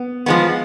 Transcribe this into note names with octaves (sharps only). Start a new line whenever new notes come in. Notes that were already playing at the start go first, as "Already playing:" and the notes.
Already playing: B3
F3 G#3 B3